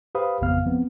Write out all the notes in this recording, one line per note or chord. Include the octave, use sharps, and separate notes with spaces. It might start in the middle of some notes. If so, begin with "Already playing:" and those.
G4 B4 C5 F5 B5 D#6
A1 F2 C#3 B3 F5 F6
F3 B3 C4